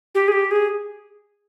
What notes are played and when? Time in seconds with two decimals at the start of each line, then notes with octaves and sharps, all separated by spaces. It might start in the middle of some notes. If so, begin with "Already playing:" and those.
0.15 G4
0.28 G#4
0.32 G4
0.51 G#4